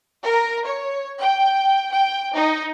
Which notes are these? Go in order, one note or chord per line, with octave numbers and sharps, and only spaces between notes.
A#4
C#5
G5
G5
D#4